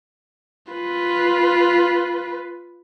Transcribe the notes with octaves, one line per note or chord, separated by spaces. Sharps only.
F4 B4